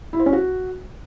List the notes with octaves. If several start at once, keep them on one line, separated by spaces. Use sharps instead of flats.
E4
C5
C#4
F#4